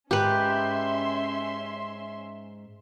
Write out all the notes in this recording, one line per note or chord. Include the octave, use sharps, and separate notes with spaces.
G#2 C#4 G4 B4 E5 C6